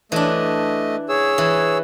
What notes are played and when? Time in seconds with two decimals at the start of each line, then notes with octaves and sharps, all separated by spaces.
0.12 E3 A3 D4 D#5
1.09 G#4 C#5 E6
1.38 E3